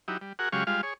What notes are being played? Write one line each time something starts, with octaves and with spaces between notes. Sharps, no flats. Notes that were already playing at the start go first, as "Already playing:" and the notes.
F#3 D#4 E4 G4
G3
F#4 G#4 A#4 F#5
C#3 F#3 G#3 G4 F5 C#6
G3 G#3 F4 F5
G#4 C#5